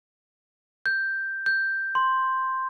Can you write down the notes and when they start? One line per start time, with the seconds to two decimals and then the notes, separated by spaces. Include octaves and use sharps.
0.86 G6
1.46 G6
1.95 C6